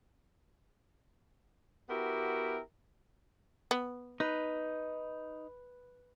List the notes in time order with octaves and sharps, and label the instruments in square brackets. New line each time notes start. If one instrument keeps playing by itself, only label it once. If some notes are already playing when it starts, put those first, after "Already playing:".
[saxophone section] B3 E4 F#4 G4 A#4
[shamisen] B3
[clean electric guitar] D#4 [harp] B4